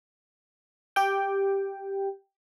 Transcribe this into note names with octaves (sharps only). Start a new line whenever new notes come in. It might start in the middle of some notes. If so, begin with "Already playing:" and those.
G4 G5